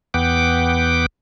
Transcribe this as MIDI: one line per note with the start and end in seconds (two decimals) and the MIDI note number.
0.14 1.06 40
0.14 1.06 59
0.14 1.06 78
0.14 1.06 79
0.14 1.06 86